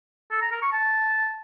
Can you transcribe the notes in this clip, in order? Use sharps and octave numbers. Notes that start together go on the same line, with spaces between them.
A4
A#5
A#4
C#6
A5